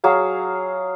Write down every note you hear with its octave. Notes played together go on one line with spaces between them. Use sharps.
F#3 G#4 F5